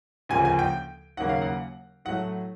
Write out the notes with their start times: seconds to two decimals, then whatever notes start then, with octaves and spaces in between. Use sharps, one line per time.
0.29 D2 C#3 F3 A#3 G#5
0.45 G#5
0.59 G5
1.17 D#2 C#3 F#3 A#3 C#4 F#5
1.29 F5
1.42 F#5
2.05 A2 F#3 A3 F#5